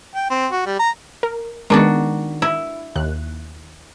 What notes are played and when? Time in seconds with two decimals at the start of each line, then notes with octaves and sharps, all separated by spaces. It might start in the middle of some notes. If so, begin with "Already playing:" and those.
0.15 G5
0.30 C4
0.52 F#4
0.66 G3
0.79 A#5
1.23 A#4
1.70 D#3 G#3 B3 D4 F#4
2.42 E4
2.96 D#2 F#6